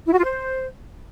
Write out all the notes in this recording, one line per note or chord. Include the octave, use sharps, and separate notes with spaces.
E4
F#4
F4
C5